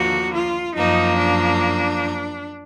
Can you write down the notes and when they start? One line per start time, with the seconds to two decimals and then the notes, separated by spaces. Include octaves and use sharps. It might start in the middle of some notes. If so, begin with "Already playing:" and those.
Already playing: D#2 D3 F3 A#3 F#4
0.34 F4
0.75 F#2 F3 A#3 D#4
1.16 D4